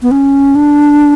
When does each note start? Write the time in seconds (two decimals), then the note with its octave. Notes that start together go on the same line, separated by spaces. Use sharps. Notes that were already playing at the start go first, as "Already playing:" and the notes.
0.02 B3
0.11 C#4
0.55 D4